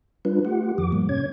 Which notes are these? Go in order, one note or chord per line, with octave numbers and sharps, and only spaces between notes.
G3 D4 F4 B4
A3 F4 G4 F#5
F2 D#3 F3 D6
G#2 F3 G3 A#3
C3 C#4 C#5 G#6